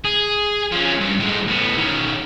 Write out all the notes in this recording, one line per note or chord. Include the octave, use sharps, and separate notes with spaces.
G#4
F3 C#4
G2
A2 G#3
A2 B3
D#3 C#4